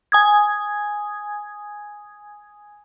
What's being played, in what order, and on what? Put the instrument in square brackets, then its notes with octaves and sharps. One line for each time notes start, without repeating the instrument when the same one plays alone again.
[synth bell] G#5 D#6 G#6